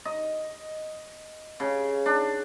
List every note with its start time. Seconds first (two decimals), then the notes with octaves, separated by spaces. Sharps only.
0.05 D#5
1.60 C#3
2.06 D4